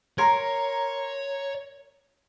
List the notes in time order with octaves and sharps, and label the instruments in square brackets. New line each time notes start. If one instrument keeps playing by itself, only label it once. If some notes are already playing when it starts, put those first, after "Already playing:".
[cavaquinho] A#4 [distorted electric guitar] C#5 [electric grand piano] A#5 C6 G#6